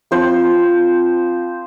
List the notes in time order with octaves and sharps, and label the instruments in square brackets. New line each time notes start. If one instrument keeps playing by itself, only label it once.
[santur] F3 C4 F4 C5